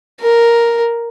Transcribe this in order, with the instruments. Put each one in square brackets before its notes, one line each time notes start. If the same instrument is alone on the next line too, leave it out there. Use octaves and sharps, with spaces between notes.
[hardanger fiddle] A#4